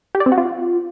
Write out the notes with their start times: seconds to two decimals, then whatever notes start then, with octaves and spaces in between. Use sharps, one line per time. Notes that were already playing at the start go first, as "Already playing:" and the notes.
0.15 G4
0.20 D5
0.26 C4
0.32 F#4
0.38 F4